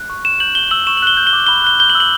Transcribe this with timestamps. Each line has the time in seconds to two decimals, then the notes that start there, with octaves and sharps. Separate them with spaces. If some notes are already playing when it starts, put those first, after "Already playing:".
Already playing: F#6
0.10 C#6
0.25 C#6 E7
0.40 G6 F#7
0.55 G6 G7
0.71 E6 F#7
0.87 C#6 E7
0.97 F#7
1.02 F#6 G7
1.17 G6
1.27 G7
1.33 D6
1.47 B5 G7
1.64 F#6 G7
1.80 G6 G7
1.90 F#7
1.95 E6
2.00 F#7